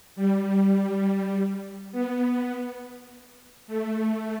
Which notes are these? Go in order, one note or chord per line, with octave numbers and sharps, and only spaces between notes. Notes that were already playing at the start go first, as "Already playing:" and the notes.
G3
B3
A3